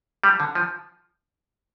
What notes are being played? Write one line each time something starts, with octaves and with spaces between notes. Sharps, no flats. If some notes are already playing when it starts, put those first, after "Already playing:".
G3
D3
F3